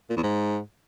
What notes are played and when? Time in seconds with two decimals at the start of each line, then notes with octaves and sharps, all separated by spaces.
0.10 A#2
0.16 E2
0.23 G#2